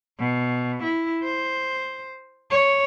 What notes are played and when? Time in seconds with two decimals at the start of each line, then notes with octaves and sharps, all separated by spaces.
0.19 B2
0.83 E4
1.23 C5
2.51 C#5